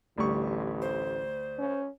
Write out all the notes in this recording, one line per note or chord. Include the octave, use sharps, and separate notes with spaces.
A1 D2 G3 C#6
C5
C#4